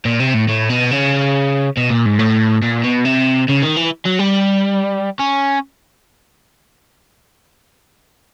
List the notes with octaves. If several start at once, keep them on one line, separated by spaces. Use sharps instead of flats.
A#2
C3
A2
A2
B2
C#3
B2
A#2
G#2
A2
A#2
B2
C3
C#3
D#3
E3
F#3
G3
C#4